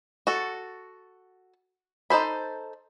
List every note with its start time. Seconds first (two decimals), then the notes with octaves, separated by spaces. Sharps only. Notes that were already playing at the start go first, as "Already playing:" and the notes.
0.27 F#4 A4
2.10 D#4 A4 C5 B5